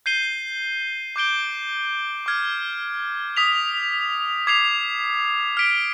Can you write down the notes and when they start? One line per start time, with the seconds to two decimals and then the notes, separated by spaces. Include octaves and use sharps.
0.06 G6 C7 D#7 G7
1.16 D6 G6 D7 G7
2.26 D6 F6 G#6
3.37 D#6 B6 F7
4.47 D6 G#6 C7 F7
5.57 F6 B6 D7 G7